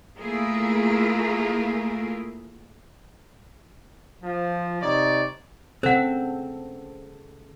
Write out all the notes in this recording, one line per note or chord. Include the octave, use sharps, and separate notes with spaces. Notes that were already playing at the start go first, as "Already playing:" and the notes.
A3 A#3 E4 F4 G#4 A#4
F3
C3 D#4 C#5 D5
C#3 C4 A4 C5 F#5